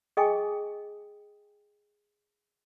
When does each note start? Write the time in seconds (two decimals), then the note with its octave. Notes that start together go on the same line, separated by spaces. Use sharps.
0.17 G#4 D#5 G5 G#5 C#6 D#6